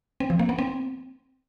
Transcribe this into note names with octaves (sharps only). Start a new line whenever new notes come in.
C4
F3
A#3
B3
C4